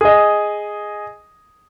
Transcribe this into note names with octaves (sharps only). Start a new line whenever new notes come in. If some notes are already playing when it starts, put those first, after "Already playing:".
G#4 D#5